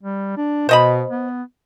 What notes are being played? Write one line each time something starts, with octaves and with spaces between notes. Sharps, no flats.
G3
D4
B2 C5 D#5 B5
B3